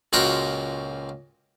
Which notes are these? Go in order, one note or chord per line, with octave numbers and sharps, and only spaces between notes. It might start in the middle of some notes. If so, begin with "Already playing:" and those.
C#2 A#2 F#4 A#4 G5 C6